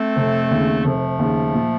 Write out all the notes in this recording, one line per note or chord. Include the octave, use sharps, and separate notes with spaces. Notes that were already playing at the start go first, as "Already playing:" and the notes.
Already playing: A3 C4
F1
D#2 C#3
F1 F3 A3
D#2 C#3
A#2